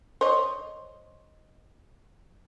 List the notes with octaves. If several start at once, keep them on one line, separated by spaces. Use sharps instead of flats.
C5 C#5 D#5